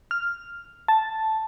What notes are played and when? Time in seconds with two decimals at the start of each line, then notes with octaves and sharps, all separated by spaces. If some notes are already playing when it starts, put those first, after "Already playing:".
0.11 F6
0.88 A5